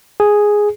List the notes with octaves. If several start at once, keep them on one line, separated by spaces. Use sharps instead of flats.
G#4